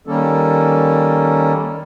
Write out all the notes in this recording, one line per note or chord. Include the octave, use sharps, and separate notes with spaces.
D#3 G3 A#3 C#4 A4